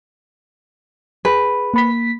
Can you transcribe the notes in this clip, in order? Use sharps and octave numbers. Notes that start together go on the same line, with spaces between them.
G#4 B4
A#3 B5 B6